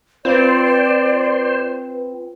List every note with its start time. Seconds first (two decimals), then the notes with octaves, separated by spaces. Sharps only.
0.25 C4 F4 B4 C5 D5